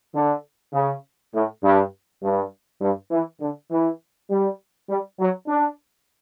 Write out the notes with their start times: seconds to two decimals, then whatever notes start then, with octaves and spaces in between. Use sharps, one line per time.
0.15 D3
0.73 C#3
1.34 A2
1.63 G2
2.23 G2
2.81 G2
3.10 E3
3.41 D3
3.70 E3
4.30 G3
4.89 G3
5.19 F#3
5.48 D4